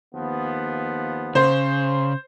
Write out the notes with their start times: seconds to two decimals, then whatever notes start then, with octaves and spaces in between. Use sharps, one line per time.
0.14 D#2 F3 B3
1.35 C#3 C5